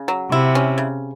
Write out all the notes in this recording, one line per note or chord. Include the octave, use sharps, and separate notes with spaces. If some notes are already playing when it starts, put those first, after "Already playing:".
Already playing: C#3
F#3
C3 E4
C#4
C#3